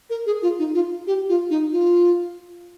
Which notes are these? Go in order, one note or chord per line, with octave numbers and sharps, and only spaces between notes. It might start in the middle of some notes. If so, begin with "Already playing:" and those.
A#4
G#4
F4
D#4
F4
G4
F4
D#4
F4